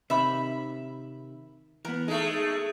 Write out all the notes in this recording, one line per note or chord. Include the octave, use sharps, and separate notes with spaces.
C3 D#3 E5 B5
E3 B3 A#4
G#3 A3 D#4